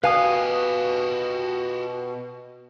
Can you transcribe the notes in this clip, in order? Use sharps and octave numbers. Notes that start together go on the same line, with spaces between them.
B2 F#4 G4 B4 F5 G#5 D#6